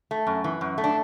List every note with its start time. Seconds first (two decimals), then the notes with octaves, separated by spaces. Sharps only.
0.11 A3
0.27 F#2
0.44 E3
0.61 F#2
0.78 A3
0.84 D4